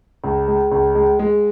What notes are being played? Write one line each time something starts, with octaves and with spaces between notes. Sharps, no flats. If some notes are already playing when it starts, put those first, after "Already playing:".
C#2
G#3
C#2
G#3
G#3